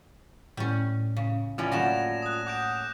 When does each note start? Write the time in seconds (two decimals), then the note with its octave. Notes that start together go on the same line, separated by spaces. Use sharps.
0.57 A2 G3 C#4
1.17 C#3
1.58 A2 C#4 F4 D5
1.72 F#3 G3 A#3 A#6 E7 F7
2.22 D#6 F#6
2.47 F#5 D6 G6 D7